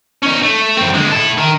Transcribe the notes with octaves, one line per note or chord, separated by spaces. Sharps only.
C#4 D#4
A3
F#2 C4
D3 G#3
E4 A4
D#3